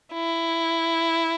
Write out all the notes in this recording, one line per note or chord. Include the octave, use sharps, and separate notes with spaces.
E4